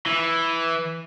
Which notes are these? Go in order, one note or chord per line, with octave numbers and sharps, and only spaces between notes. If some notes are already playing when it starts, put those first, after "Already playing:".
E3